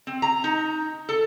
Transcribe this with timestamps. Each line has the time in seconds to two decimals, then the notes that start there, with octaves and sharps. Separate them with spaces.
0.07 C4
0.22 A#5
0.44 D#4
1.09 A4